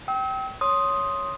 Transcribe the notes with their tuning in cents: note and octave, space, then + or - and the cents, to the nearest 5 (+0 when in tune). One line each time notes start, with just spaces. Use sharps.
G5 -20 E6 -45
C#5 +5 C6 +10 D#6 +0